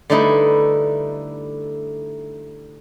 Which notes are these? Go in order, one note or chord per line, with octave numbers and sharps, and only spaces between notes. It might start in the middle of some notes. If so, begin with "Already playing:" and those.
D3 G3 A3 D#4 E4 B4